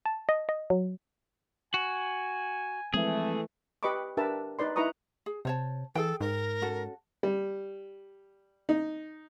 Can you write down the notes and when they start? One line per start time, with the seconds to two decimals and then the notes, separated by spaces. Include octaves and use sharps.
0.06 A5
0.29 D#5
0.49 D#5
0.70 F#3
1.74 F#4 G#5
2.94 E3 F3 G#3 A3 C4 G#4
3.83 G4 B4 D#5 B5 C#6 D6
4.17 D4 G4 A#4 B4 E5 A5
4.59 D#4 B4 D5 C6
4.76 D#4 E4 B4 A#5 C#6 D#6
5.26 G#4
5.45 C3 C5 C#5 A5
5.95 E3 G#4 A4 G5
6.20 G#2 A#4
6.61 C#4 F#4 A4
7.23 G3
8.69 D#4